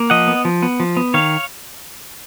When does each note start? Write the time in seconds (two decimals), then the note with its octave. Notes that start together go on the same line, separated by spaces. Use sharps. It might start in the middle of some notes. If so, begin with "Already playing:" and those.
Already playing: A#3
0.10 F3 D#5 F#5
0.28 B3
0.45 F3
0.62 B3
0.80 F3
0.97 B3
1.14 D#3 C#5 F5